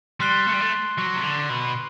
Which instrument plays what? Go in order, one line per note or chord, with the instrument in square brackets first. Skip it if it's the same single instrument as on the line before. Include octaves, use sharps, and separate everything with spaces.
[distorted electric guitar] G3 [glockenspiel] C6 F#6 C7 G7
[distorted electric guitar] A3
G3
A3
F#3
C3
D3
B2